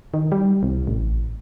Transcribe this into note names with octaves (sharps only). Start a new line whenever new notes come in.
D#3
G3
C2
A1